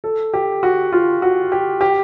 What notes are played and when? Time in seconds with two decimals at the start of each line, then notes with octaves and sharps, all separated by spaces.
0.04 A4
0.34 G4
0.63 F#4
0.92 F4
1.22 F#4
1.52 G4
1.81 G4